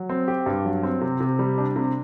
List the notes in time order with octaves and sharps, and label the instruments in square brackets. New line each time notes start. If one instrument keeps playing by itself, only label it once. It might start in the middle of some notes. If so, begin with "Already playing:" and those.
Already playing: [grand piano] F#3
C4
G4
G2
F#3
C4
C3
C3
G3
D4
C3